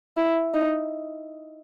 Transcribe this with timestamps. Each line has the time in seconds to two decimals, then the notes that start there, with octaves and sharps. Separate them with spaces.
0.17 E4
0.54 D#4